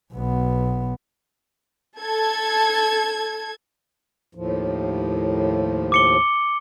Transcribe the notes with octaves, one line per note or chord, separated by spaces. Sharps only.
B1 B3
A4 G#6
D#2 A2 F3
D6 C#7 G7